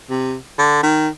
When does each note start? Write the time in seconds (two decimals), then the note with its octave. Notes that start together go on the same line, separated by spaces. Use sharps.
0.10 C3
0.58 D3
0.83 D#3